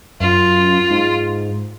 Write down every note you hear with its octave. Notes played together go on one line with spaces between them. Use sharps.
F#2 F4
G#2